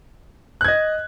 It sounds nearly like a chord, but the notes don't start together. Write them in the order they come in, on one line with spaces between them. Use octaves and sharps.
F#6 G#6 D#5